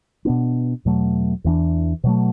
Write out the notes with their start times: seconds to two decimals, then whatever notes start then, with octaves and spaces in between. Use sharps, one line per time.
0.25 B2 B3 D4
0.85 E2 B2 F#3 A3
1.44 E2 E3 B3 D4
2.04 B2 F#3 A3